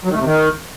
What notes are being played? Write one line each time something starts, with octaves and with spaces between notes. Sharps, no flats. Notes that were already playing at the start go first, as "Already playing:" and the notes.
F#3
D#3
A3
C3
D#3